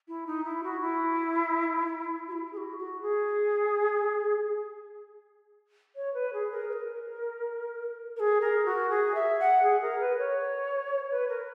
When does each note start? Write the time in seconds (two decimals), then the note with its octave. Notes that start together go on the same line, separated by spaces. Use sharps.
0.08 E4
0.27 D#4
0.45 E4
0.64 F#4
0.81 E4
2.28 F#4
2.32 E4
2.53 G#4
2.57 F#4
2.78 F#4
3.02 G#4
5.96 C#5
6.14 B4
6.33 G#4
6.52 A#4
6.69 B4
6.73 A#4
8.16 A#4
8.20 G#4
8.41 A#4
8.65 F#4
8.90 G#4
9.15 E5
9.40 F#5
9.63 G#4
9.82 A#4
10.00 B4
10.18 C#5
11.11 B4
11.29 A#4